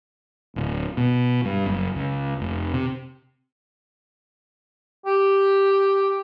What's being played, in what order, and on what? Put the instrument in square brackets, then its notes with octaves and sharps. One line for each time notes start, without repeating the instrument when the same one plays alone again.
[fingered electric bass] D1
B2
G2
F#1
C#2
F1
C3
[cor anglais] G4